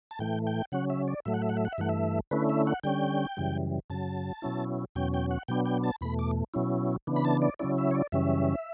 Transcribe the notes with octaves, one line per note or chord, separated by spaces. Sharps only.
A5
A2 E3 A3 G5
G5
C#3 F#3 C#4 F#5
E5
D5
A2 F#3 A3 E5
F#5
E5
F#5
E5
F#5
E5
G2 E3 A3 F#5
E5
D3 A3 C#4 E4 B4
E5
F#5
D3 G3 C#4 G5
F#2 C#3 E3 G3
F#2 C#3 F#3 A5
B2 F#3 C#4 E4
E2 B2 F#3 C#4 G5
G5
F#5
B2 F#3 B3 D4 G5
G5
A5
E2 B2 A3 B5
D6
B2 F#3 C#4 E4
C#3 E3 B3 D4
B5
A5
D5
C#3 F#3 C#4 E4 D5
E5
C#5
D5
F#2 C#3 E3 G3 C#4 E5